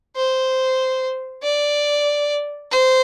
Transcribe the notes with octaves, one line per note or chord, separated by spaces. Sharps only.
C5
D5
C5